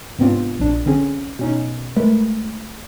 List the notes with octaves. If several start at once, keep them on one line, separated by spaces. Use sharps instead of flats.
G#2 C3 B3 C4 D4 F4
A#1 D4
D3 C4 C#4 G#4
B2 C#4 D#4
G#3 A3 A#4 B4